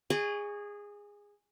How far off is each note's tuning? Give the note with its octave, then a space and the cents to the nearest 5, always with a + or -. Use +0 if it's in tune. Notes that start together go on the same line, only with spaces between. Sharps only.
G#4 -15 D#5 -45 C#6 +15